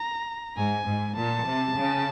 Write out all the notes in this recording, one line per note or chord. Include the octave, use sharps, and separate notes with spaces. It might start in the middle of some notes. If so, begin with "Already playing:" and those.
Already playing: A#5
G#2 G#5
G#2
A#2 A5
C3
C#3